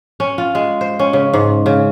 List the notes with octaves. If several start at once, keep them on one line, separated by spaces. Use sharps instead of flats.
C#4
F4
G#3
C5
C#4
C#3
G#2
C#3